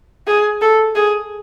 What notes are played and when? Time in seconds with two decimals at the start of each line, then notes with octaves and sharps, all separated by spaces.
0.27 G#4
0.62 A4
0.95 G#4